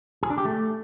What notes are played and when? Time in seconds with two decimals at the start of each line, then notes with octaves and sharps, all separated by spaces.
0.23 G#4
0.30 D4
0.38 G4
0.45 A3